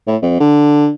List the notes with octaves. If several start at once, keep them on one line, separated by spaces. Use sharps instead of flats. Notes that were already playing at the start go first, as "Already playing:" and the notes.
A2
F2
D3